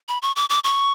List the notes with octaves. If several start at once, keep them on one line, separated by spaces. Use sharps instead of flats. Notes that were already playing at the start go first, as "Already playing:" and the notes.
B5
C#6
D6
D6
C#6